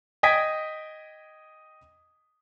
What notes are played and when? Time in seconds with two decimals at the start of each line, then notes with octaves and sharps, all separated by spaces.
0.23 D#5 G5 D#6 G#6 B6 D7